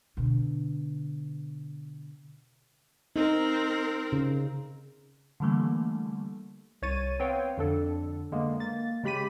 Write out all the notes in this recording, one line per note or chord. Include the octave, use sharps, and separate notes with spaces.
B2 D3
C4 D#4 A#4
C#3
D3 E3 G3 A3 A#3
C2 C#5 C#6 A6 D#7
B3 C4 B4 C#5 F5 G5
F2 D3 D4 A4
D3 G#3 A#3 B3
A#3 A6
C#3 G#3 G4 B5 B6 D#7